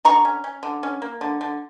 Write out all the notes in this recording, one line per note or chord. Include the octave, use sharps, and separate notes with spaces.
D3 A#5 C#6
C#4
C#4
D3
C#4
A#3
D3
D3